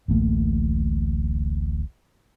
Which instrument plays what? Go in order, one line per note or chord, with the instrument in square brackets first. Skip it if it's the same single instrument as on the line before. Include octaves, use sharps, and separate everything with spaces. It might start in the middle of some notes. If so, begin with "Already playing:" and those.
[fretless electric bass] D1 A1 A3 A#3